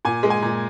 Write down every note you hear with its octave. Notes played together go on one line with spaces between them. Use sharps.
A#2 G#5
G#3
G#5
A#2